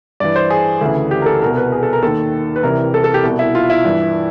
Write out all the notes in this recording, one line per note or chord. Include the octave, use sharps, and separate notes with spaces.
G2 E3 D5
C5
G#4
D2 C#3 E3
G4
A#4
A4
C2 B2 A#4
B4
G#4
A4
A#4
D#2 D#3 A4
B4
C2 C3 E3 A#4
A4
A4
G4
C2 B2
E4
F4
E4
G2 E3